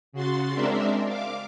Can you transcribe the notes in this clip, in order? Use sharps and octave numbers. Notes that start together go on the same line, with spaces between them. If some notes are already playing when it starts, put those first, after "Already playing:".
C#3 F#4 C6 A6
G#3 C4 D4 A#4 D5 E5
F5 D6